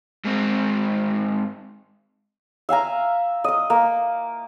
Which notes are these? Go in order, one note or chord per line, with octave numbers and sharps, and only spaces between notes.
G#2 C4
E5 F5 G#5 A#5
D#5 D#6
A#3